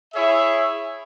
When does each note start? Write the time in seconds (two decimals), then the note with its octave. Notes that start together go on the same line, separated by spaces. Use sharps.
0.14 E4 G#4 C#5 E5